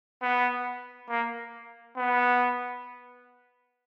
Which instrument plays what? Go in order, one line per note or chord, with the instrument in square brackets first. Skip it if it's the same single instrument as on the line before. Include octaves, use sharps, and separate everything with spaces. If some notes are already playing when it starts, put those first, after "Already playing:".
[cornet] B3
A#3
B3